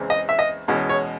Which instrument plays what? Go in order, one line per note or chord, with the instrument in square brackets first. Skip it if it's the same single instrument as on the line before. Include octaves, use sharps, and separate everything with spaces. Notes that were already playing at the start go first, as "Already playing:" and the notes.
Already playing: [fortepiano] E2 C#3 E3 G#3 C4
D#5
E5
D#5
E2 B2 G#3 C#4
C#5